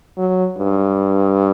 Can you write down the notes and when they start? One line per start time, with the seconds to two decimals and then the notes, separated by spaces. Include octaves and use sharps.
0.17 F#3
0.57 G2